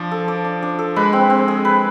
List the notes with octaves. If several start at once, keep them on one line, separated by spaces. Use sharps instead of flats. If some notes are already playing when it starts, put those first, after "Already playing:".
Already playing: F3 D4 D5
A4
D5
D4
D4
A4
G#3 B4
C4
C4
G#4
B4